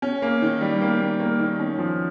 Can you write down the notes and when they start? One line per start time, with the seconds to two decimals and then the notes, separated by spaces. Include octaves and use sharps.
0.02 C#4
0.22 A#3
0.42 D#3
0.61 G3
0.82 A#3
1.00 A#3
1.20 A#3
1.40 D#3
1.59 C#4
1.79 F3